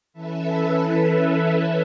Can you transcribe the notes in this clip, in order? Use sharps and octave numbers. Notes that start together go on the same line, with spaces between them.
E3 C#4 A4 B4 E5